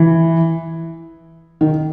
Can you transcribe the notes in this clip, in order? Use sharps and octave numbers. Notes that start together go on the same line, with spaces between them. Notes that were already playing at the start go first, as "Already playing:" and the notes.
Already playing: E3
D#3